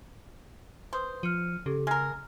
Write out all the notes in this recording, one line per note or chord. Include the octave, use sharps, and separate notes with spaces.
B4 C5 C6 D#6
F3 F6 C#7 D#7
C#3 G4 A4
G#3 A#4 F6